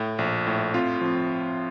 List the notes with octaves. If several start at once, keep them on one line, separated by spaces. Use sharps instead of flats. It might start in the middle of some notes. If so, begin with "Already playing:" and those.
Already playing: A2
A#1
A2
C4 F4
F3 C4